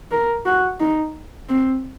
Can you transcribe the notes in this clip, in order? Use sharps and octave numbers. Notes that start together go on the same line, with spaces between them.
A#4
F#4
D#4
C4